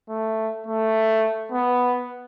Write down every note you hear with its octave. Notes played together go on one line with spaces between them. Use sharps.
A3
A3
B3